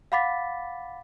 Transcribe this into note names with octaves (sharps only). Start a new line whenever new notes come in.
F5 F#5 B5 D6 A6 B6